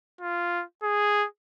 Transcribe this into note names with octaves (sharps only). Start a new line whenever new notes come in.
F4
G#4